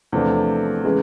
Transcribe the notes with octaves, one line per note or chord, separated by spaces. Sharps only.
E2 C3 F3 A3 D4
C#3 E3 G#3